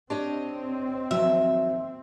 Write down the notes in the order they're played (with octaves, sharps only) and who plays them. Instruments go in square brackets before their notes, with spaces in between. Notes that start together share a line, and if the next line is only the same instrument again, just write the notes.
[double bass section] C4 [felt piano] D4 [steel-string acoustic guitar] G4 C#5 D#5
[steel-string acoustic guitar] D#2 F3 [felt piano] F#3 [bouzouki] E5